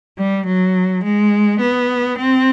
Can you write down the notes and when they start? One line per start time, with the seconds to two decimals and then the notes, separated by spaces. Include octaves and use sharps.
0.18 G3
0.47 F#3
1.04 G#3
1.61 B3
2.18 C4